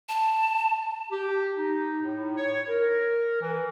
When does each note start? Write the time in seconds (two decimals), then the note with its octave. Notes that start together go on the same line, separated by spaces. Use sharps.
0.09 A5
1.12 G4
1.57 D#4
2.03 A2
2.37 C#5
2.69 A#4
3.42 E3